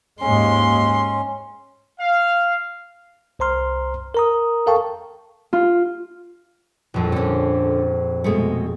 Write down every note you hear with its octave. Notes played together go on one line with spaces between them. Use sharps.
D#2 G#2 G#3 C#4 C6
F5
C2 C5 A#5 C6 F6
A#4 A#5 D#6
A4 A#4 F5 G5 A5 C#6
F4
A#1 F2
D3 C#4
B2 G#3 A3